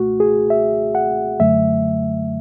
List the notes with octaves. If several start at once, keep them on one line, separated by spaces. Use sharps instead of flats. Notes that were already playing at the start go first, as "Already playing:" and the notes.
Already playing: C#2 B2 A3 F#4
G#4
E5
F#5
F#2 D3 F#3 A3 E5